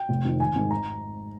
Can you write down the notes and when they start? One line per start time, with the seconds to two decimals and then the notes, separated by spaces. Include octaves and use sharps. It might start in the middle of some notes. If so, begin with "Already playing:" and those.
Already playing: G5
0.09 F1
0.25 F2 D#3
0.40 G#1 G#5
0.56 G#2 D#3
0.71 A#5